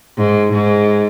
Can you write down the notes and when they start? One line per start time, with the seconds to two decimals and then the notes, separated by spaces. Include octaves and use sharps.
0.18 G#2
0.53 G#2